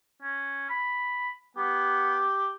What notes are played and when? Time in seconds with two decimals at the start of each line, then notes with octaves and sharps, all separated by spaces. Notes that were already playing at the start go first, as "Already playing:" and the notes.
0.22 C#4
0.70 B5
1.57 B3 G4